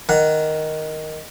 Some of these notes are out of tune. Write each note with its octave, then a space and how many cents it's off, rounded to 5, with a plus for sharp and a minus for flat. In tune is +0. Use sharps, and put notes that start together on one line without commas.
D#3 +0 F#5 +0